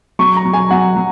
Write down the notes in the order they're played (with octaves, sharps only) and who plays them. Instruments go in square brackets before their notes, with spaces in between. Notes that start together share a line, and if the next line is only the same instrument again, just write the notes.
[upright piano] F#3 [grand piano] C#6
[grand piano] A#5
[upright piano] F#3
[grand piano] G#5
[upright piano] F#3 [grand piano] F#5
[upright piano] F#3